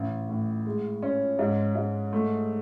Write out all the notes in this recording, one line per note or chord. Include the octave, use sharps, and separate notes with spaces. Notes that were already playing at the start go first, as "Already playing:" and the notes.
Already playing: A1
A2
G#3
C#4
G#2
G#2
A3